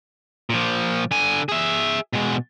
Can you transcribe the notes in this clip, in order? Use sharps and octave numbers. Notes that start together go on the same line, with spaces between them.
A#2 F3
D3 G#5
G#4 E5
B2 G#3